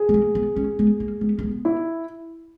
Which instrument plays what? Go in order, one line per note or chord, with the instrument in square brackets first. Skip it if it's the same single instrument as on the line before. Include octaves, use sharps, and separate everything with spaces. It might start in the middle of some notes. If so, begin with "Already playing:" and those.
Already playing: [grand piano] G#4
[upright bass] B3
A#3
B3
C#4
B3
A#3
B3
A#3
B3
[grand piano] E4